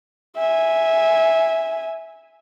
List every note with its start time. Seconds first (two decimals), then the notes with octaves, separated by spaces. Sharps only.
0.37 E5 G#5